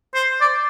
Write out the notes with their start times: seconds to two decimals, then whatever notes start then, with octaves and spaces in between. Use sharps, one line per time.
0.14 C5
0.41 D5